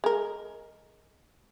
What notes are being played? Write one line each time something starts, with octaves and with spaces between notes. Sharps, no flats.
G#3 A#4